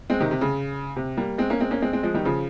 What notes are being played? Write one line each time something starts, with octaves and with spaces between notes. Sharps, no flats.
G#3 C4
C3 D#3
C3
C#3
C3
G3 A#3
G#3 C4
A#3 C#4
G#3 C4
A#3 C#4
G#3 C4
G#3 C4
F3 G#3
D#3 G3
C#3 F3